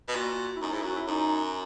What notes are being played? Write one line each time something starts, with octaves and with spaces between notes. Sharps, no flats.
B2
A#2 F#4
E4
F#2 D#4
G#2 E4
F#2 F#4
E4
F#2 D#4